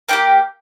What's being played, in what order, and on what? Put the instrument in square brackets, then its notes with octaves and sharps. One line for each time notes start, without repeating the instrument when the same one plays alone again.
[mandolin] A#3 E4 G4 G5